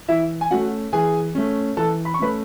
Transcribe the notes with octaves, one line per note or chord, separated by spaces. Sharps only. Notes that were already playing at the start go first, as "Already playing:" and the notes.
E3 E4 E5
G#5
A3 C#4 F#4 F#5
E3 G#4 G#5
A3 C#4
E3 A4 A5
B5
C#6
A3 C#4 B4 B5